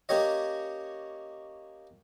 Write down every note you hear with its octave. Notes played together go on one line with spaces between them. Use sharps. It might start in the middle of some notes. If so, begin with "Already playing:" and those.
A#3 C#4 G4 C#5 D#5